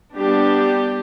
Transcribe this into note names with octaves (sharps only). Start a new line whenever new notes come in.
G3 B3 D4 G4